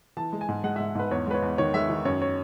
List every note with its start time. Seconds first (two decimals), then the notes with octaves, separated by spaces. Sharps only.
0.17 E3 A5
0.33 G#3
0.41 G#5
0.48 G#2
0.64 G#3 F#5
0.76 E5
0.79 G#2
0.95 G#2 B4
1.11 E2 C#5
1.27 G#3 B4
1.34 C#5
1.42 E2
1.58 D#3 C#5
1.74 G#3 E5
1.90 D#3
2.05 F#2 C#5
2.22 C#5